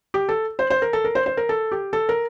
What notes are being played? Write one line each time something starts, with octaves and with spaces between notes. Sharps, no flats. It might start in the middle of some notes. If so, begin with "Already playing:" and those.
G4
A4
C5
C5
A#4
A4
A#4
C5
C5
A#4
A4
G4
A4
A#4